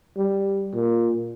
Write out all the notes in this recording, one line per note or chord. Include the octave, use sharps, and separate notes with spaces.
G3
A#2